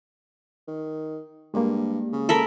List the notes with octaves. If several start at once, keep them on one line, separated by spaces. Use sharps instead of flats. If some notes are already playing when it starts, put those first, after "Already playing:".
D#3
G2 G#3 A#3
C#3
A4 A#4 B5